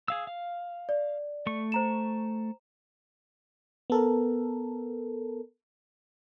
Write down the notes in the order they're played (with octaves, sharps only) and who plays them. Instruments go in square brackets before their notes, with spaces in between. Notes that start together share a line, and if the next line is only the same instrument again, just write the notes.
[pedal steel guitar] G#4 F5 E6
F5
[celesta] D5
[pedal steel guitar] A3 C#6
[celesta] C5 A#5 E7
[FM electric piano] B3 A4 A#4